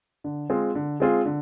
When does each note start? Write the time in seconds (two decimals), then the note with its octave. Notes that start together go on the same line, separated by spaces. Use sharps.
0.24 D3
0.50 G#3 C4 F4 G#4
0.75 D3
1.00 G#3 C4 F4 G#4
1.25 D3